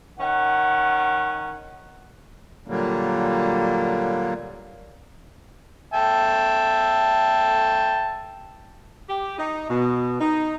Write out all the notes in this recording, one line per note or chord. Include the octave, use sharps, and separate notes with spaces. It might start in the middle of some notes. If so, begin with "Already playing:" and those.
D#3 C#4 F#5
A#2 D3 F#3 G3 A#3
E5 G5 A5
G4
D#4
B2
D#4